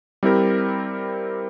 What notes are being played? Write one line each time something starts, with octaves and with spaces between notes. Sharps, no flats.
G3 C4 E4 G4 A#4